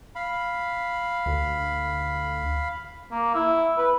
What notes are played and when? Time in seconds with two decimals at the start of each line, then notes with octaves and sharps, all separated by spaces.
0.15 F5 B5
1.26 D2
3.11 A#3
3.35 E4
3.78 B4